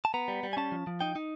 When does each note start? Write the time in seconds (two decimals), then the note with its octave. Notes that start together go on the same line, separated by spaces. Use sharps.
0.05 A5
0.14 B3 A#5
0.28 G3
0.43 G3
0.53 G#5
0.57 C#4 A5
0.72 F3
0.87 F3
1.01 D#4 G5
1.16 D#4